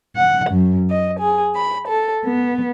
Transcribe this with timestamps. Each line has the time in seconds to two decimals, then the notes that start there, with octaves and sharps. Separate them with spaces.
0.15 F#5
0.50 F#2
0.89 D#5
1.19 G#4
1.55 B5
1.87 A4
2.24 B3